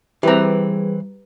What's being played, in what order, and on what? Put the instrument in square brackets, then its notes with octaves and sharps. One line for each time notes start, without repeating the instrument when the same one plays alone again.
[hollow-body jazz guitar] E3 C4 [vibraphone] G3 G#4 [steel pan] G4 B4 A#5